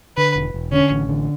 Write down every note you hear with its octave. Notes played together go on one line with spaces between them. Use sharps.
D3 B4
E1
E1
D3 C#4
A1
D3